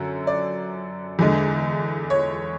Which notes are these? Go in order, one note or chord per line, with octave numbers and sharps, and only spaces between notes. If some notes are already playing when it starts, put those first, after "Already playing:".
Already playing: F#2 D3 F#3
D5
E2 D3 G#3
C#5